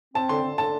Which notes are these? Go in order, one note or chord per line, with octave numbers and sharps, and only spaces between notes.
C4 A5
D3 C6
D3
D3 A5